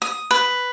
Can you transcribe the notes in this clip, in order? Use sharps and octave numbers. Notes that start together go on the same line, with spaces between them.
D#6
B4